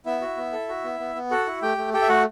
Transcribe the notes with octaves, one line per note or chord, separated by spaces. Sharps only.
B3 E4 E5
F#4
B3
A4
F#4
B3
B3
B3
F#4 A4 F#5
E4
A3 G4 G5
A3
G4 A4 G5
E5
A3 F#4 F#5